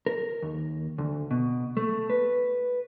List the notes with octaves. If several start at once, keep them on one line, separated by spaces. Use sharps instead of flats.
A#4
D#2
D2
B2
A3
B4